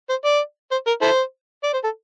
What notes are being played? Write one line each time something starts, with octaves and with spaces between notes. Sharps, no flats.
C5
D5
C5
A#4
E4 A4 C5
D5
C5
A4